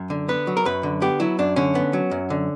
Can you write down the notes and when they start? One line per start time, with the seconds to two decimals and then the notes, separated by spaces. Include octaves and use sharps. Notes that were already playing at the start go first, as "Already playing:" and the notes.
Already playing: F#2
0.10 D3
0.28 B3 B4
0.47 F#3
0.57 A#4
0.65 F#2 B4
0.83 D3
1.02 B3 G4
1.20 F#3 E4
1.39 F#2 D4
1.56 D3 C#4
1.75 B3
1.93 F#3
2.11 F#2
2.30 D3